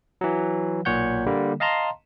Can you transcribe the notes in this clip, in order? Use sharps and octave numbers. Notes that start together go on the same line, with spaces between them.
E3 F#3
B1 A#2 C#5 F#5 G6
D3 G3 A#3
D#5 F5 A5 A#5 C6